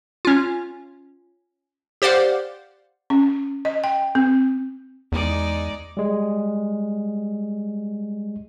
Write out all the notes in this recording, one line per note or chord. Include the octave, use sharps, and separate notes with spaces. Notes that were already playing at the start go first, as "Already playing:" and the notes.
C#4 F4
G4 C5 D5 F5 F#5
C#4
D#5
G5
C4
E2 G#3 D#4 D5
G3 G#3